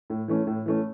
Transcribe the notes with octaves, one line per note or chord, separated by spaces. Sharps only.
A2
E3 A3 C#4
A2
E3 A3 C#4